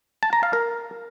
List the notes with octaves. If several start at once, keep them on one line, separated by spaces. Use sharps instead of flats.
A5
A#5
F5
A#4